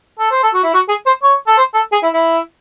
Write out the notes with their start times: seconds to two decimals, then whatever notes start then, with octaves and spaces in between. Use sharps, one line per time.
0.19 A4
0.31 C5
0.43 A4
0.54 F#4
0.63 E4
0.74 F#4
0.89 G#4
1.06 C5
1.23 C#5
1.47 A4
1.57 C5
1.74 A4
1.92 G#4
2.03 E4
2.14 E4